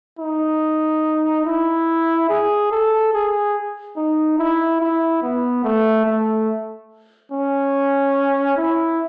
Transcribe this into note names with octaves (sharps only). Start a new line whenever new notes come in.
D#4
E4
G#4
A4
G#4
D#4
E4
E4
B3
A3
A3
C#4
E4